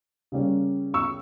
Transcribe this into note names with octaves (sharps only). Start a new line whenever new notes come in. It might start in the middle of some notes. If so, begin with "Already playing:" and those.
C#3 G3 A#3 C#4
C#6 E6